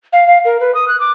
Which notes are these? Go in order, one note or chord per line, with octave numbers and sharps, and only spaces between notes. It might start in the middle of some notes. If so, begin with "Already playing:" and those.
F5
F5
A#4
B4
D#6
F#6
D6